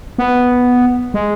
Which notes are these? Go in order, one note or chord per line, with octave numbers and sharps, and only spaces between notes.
B3
G#3